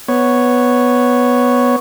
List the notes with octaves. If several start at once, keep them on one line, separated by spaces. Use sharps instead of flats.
B3 C#5